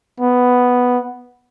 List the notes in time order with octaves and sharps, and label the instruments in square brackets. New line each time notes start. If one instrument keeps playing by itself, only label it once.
[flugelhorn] B3